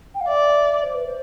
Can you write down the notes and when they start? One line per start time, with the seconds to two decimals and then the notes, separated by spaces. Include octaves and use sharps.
0.14 G5
0.20 F5
0.28 D5 E5
0.83 C5
0.94 B4
1.06 C5